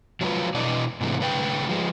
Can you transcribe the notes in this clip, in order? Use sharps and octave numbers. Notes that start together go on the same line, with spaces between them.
F3 F#3 G#3 C#4 F4 B4
B2 D4 E4 D5 D#5
G#2 C3 E3 A3
A2 C#3 B4 D#5 G5
F3 G#3